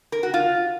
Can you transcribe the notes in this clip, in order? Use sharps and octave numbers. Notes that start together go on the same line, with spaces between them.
A#4
F#4
F4